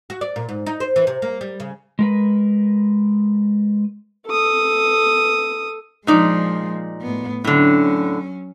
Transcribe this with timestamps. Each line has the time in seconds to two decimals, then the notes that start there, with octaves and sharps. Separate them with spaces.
0.10 F#4
0.21 D5
0.36 A#2
0.49 G#2
0.66 D#4
0.80 C5
0.96 E3
1.07 C3
1.22 A#3
1.41 G3
1.60 C#3
1.99 G#3 A#4 B4
4.26 A4 D#6
6.07 A#2 F3 G#3 D#4 D5
7.02 A2 B3
7.44 A2 D3 F#3 C#4